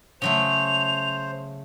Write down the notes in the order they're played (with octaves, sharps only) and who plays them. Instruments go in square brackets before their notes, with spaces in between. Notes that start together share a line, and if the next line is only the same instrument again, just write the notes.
[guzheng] C#3 F#3 A3 [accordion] C5 [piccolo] F7